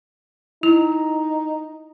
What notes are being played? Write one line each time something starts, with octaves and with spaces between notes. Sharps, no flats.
D#4 E4